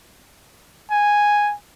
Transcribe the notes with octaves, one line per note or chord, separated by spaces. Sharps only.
G#5